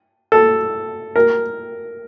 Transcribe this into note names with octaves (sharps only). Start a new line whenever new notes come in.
A4
A#4